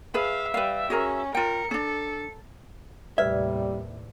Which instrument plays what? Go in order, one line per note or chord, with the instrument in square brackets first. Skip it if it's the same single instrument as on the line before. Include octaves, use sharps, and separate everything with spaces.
[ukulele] G#4 B4 B5 [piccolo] E5 [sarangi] F5
[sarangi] G3 [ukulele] B4 F5
[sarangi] C#4 [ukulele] F#4 G#4 A#4
[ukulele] F4 G5 [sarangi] A#4 [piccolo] C#7
[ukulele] C#4 D4 [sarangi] A4
[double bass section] D#2 A2 C3 [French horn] G3 [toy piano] B4 D5 [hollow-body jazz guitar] E5